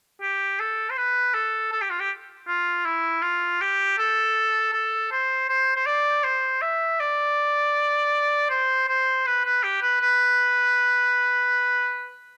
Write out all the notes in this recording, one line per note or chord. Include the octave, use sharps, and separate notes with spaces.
G4
A4
C5
B4
A4
A4
G4
F4
G4
F4
E4
F4
G4
A4
A4
C5
C5
C5
D5
C5
E5
D5
C5
C5
B4
B4
G4
B4
B4